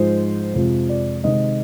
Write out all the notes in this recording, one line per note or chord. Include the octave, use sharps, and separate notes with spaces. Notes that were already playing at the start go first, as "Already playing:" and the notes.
Already playing: G#2 F3 G#3 C5
F2 C3 F3 G#3
D5
C3 D#3 G#3 D#5